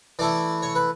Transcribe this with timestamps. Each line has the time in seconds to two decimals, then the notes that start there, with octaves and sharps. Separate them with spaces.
0.19 E3 A3 E4 D5
0.62 C#5
0.75 B4